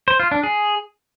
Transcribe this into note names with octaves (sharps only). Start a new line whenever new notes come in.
C5
F4
D4
G#4